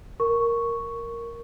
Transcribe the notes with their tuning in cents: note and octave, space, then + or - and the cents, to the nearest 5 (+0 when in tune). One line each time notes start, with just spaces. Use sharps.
A#4 +0 C#6 +0